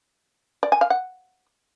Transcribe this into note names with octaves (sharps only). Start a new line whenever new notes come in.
D5
G#5
F5
F#5